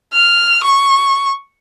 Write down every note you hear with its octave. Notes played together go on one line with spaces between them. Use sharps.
F6
C#6